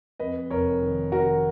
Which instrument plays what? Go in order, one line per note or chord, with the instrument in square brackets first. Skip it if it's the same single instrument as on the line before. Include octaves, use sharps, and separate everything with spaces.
[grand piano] F2 B4 D#5
F1 A#4 C#5
D#3
D#3 F#4 A#4